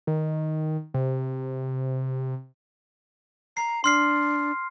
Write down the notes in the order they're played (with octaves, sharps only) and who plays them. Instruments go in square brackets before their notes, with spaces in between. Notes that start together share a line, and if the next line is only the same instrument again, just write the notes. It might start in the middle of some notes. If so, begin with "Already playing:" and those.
[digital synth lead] D#3
C3
[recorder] A#5 [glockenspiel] C7
[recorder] D4 [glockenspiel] C6 F6 C7